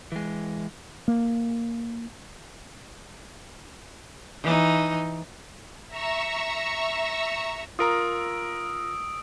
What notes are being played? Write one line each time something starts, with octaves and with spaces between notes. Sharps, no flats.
E3 G#3
A#3
E3 D#4
E5 A#5 C#6 E6
F4 A#4 A#5 D#6 E6 D7